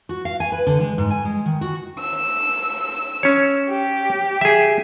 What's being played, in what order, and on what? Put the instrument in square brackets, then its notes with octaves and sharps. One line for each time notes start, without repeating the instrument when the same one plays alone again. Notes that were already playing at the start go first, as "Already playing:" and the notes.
[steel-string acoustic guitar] F#4
F5
G#5
B4
D3
G#3
G#2
G#5
G#3
D#3
F#4
[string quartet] E6
[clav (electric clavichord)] C#4 C#5
[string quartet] G4
[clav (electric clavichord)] G#4 E5